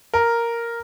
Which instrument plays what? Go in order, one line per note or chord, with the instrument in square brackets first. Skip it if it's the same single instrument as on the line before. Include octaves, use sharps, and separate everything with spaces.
[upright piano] A#4